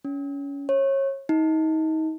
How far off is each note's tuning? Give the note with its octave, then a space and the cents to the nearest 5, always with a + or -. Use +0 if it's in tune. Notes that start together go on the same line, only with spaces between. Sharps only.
C#4 +25
C#5 -25
D#4 +30